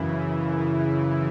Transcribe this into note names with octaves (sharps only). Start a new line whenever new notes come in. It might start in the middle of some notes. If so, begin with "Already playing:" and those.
Already playing: F#2 C#3 E3 E4